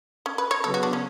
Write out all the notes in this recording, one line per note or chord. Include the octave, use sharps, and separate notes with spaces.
C#4
B4
C#5
C#3 F#3 B3 A4
F#4
D4
C#4